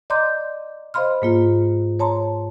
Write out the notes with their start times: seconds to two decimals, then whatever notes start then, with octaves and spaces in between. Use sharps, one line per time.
0.10 D5 D#5 A#5 C6 D6 G6
0.94 C5 D#5 F5 B5 C6 F6
1.22 G#2 A#3 F4
1.99 C#5 A5 A#5 C6